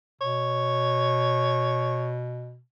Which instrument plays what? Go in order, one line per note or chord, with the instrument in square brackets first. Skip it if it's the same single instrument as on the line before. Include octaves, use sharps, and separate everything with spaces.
[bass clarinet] B2 [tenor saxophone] C#5